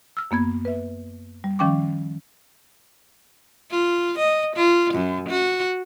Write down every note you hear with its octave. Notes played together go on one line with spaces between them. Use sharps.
E6 F6
F#2 A#3 B3 G#6
B4 E5
G3
D#3 F3 C#4 G5 C#6 D6
F4
D#5
F4
F#2
F#4